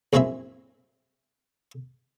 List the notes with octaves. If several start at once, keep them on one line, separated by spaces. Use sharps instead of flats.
A#1 F#2 G#3 C4 E4 E5